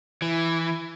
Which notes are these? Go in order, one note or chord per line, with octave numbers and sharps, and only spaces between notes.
E3